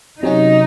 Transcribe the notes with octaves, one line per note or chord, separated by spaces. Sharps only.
C3 F#3 C#4 D#4 F#4